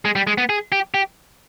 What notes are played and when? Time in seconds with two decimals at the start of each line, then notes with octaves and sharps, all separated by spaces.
0.05 G#3
0.16 G3
0.27 G#3
0.38 B3
0.49 G#4
0.72 G4
0.94 G4